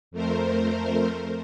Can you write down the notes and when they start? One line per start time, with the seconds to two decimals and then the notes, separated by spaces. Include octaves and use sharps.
0.11 F2 A3 A#4 C5